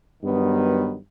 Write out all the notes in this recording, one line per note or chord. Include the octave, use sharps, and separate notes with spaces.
G2 D#3 F#3 B3